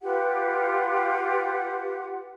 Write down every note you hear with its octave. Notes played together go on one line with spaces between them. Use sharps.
F4 G4 B4 F#5